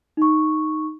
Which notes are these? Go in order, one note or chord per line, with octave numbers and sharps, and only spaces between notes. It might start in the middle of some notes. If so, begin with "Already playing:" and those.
D#4 C#6